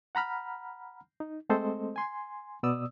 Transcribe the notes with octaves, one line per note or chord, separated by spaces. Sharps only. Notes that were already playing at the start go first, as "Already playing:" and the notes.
F#5 A#5 B5 F6
D#4
G#3 A3 C4 A4 C5 D#5
G#5 C6
B2 B3 D5 D#6 E6